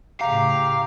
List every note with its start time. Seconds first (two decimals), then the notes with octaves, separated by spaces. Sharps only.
0.21 A2 C#3 G4 F5 A#5